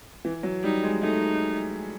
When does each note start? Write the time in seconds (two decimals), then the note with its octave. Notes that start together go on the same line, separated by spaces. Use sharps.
0.25 E3
0.43 F#3
0.63 G3 D#4
0.83 G#3
1.02 A3 D#4